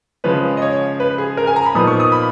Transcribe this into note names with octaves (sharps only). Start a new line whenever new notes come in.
C#3 F3 G#3 C#4 B4
D#5
C#5
B4
G#4
A#4
G#5
A#5
B5
A#2 F3 B3 D#4 D#6
C#6
D#6
B5